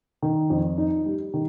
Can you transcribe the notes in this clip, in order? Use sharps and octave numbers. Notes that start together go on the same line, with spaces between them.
D#3
F2
D#4
G3
D#3